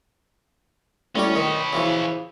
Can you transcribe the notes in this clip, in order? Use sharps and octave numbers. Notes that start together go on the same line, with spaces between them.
A2 G3 C#4 D6
D#3 B4 C#5
C#3 E3 F3